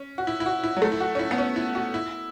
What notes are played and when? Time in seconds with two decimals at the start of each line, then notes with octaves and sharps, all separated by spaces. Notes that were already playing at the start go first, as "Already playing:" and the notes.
Already playing: C#4
0.18 F#4
0.27 E4
0.40 E4
0.46 F#4
0.63 E4
0.77 F#3
0.82 A3
0.92 E4
1.00 F#4
1.15 C#4
1.19 E4
1.31 B3
1.38 C#4
1.56 E4
1.75 F#4
1.94 E4